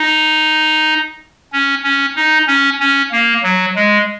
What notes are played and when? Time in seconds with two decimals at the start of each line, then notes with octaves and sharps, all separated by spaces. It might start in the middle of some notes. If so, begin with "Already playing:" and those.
Already playing: D#4
1.53 C#4
1.84 C#4
2.16 D#4
2.47 C#4
2.80 C#4
3.11 A#3
3.43 F#3
3.76 G#3